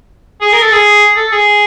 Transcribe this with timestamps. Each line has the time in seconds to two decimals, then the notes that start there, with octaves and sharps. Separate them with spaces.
0.41 G#4
0.53 A#4
0.62 A4
0.72 G#4
1.16 A4
1.32 G#4